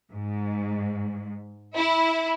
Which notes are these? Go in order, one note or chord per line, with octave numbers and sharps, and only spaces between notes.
G#2
E4